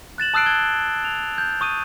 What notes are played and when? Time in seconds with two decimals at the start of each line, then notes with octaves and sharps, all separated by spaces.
0.18 F#6 A6 E7 F#7
0.34 A5 D#6 E6 F#6 C7 D7
0.46 G#6 G7
1.04 F7
1.38 G6
1.61 C#6 D#6 D#7